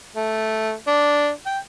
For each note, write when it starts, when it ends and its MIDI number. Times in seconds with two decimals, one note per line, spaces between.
0.16 0.73 57
0.88 1.29 62
1.46 1.58 79